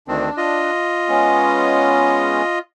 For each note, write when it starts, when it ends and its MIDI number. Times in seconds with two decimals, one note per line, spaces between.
0.08 0.30 38
0.08 0.30 51
0.08 0.30 60
0.08 0.71 62
0.37 2.59 65
0.37 2.59 75
1.09 2.42 56
1.09 2.42 59
1.09 2.42 61